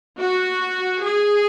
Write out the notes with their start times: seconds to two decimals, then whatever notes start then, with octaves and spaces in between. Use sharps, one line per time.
0.20 F#4
1.02 G#4